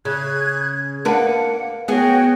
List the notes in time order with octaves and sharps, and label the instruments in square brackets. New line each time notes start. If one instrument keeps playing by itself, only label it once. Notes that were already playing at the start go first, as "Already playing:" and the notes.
[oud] C#3 [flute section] F#6 G#6
[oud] A#3 D4 B4 [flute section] F#5
[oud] B3 G#4 [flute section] F#4 C#5 G5